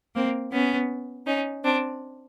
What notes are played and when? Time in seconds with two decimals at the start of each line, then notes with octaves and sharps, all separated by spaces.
0.15 A#3 C4
0.53 B3 C#4
1.26 C#4 D#4
1.64 C4 D4